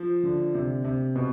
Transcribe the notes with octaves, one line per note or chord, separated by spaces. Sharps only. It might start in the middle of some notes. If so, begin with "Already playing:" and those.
Already playing: F3
D3
C3
C3
B2